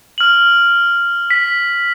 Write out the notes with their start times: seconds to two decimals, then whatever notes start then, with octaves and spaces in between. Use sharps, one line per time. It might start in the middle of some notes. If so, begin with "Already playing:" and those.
0.18 F6 F#7
1.30 B6